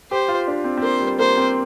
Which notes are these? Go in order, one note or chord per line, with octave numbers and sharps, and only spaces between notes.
G4 C5
F4
D4
C4
C4
A#3 C5
G3
A#3 C5
C4